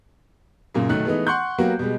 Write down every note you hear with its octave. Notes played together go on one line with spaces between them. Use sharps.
F#2 A#2 C#3 A#3
B1 D#3 F#3 A3 F#6
E3 G#3 A3 B3 D#4
F#5 C6 C#6 F#6 G6
F#3 A#3 B3 F#4 G4
B2 G3 G#3